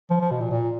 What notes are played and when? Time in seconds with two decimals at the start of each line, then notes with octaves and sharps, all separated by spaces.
0.10 F3
0.20 F3
0.31 B2
0.41 A#2
0.51 A#2